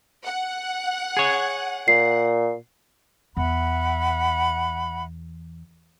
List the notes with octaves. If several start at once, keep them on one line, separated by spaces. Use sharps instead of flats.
F#5
G#4 C#5
A#2 C7
E2 E5 F#5 B5